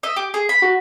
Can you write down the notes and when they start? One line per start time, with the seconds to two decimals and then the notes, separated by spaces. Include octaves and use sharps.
0.03 D#5 E5
0.16 G4
0.34 G#4
0.49 B5
0.62 F#4